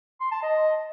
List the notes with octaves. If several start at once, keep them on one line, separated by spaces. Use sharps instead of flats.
C6
A5
D#5